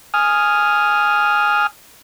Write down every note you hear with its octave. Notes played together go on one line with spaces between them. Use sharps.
G#5 D#6 F6